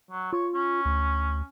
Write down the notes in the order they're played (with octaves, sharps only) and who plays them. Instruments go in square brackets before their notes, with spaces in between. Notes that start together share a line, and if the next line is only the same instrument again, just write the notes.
[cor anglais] F#3
[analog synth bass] F4 [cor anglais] C#5
[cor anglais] C#4
[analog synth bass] D2